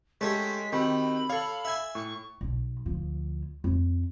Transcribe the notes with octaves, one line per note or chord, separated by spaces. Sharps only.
G#3 A3 C#4 G4 B6
D#3 C4 F#4 G4 B5
A4 C#5 F5
E5 G#5
A2 C#6
B1
D2 F3
F2